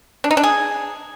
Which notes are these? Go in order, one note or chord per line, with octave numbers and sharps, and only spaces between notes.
D4
D#4
D4
G#4